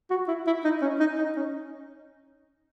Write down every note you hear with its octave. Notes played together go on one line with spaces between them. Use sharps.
F#4
E4
E4
D#4
C#4
D#4
D#4
C#4